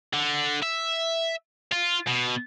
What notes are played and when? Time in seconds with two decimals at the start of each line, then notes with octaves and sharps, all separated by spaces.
0.13 D3
0.63 E5
1.72 F4
2.08 B2